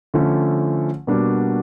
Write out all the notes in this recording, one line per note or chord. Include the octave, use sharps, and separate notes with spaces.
D3 F3 A3 C#4
B2 G3 A#3 D4 F#4